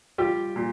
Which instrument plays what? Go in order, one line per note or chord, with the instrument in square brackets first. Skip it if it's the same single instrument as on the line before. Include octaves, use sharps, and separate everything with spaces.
[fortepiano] G3 F4 G4
A#2